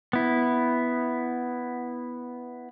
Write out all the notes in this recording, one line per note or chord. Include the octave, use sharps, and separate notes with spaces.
B3 E4